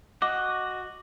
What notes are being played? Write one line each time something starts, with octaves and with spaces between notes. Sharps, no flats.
F#4 D#5 D6